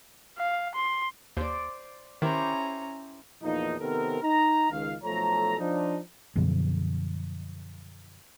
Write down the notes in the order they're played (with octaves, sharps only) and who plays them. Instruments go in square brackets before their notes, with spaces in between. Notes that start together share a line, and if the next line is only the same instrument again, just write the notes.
[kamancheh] F5
C6
[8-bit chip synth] D#2 [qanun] C5 D5
[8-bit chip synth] D#3 [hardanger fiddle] C#4 A#5 [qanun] E4 G4 C5
[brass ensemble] E2 A#2 F3 A#3 D#4
C3 D#3 B3 C4 A4 A#4
D#4 A#5
C#2 D#3 F5
B1 F3 A3 A4 C#5 A#5
F3 D4 D#4
[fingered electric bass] F#2 B2 D3 F3